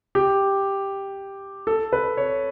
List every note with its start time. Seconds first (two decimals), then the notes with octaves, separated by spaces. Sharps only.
0.15 G4
1.67 A4
1.93 B4
2.17 C#5